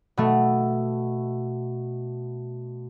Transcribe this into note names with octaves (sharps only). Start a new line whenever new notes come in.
B2 A3